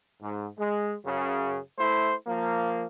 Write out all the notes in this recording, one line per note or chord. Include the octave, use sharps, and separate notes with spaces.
G#2
G#3
F#2 C#3
A3 E4 C5
F3 A#3